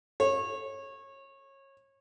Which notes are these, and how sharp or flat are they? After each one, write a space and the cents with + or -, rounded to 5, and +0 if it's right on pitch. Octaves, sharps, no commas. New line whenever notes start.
C#5 -25